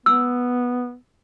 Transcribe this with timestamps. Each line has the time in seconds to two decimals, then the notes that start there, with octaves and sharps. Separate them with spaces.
0.06 B3 E6